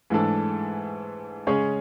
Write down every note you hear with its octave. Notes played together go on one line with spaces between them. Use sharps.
G#2 E3 A3 D4 A4
C#3 G#3 C#4 G#4 C#5